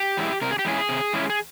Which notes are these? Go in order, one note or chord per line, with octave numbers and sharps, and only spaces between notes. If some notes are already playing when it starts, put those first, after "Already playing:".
Already playing: G4
E3 G#3 C#4 E4
C3 A#4
G#4
G4
E3 G#3 C#4 E4 G#4
C3
E3 G#3 C#4 E4
G#4